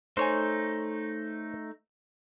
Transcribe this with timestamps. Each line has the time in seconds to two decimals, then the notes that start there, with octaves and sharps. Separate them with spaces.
0.17 A3 D#4 C5 C#5 G#5